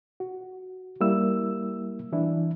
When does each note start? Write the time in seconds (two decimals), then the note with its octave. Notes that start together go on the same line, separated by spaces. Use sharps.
0.20 F#4
1.01 G3 A#3 E4 E6
2.12 E3 D4 E4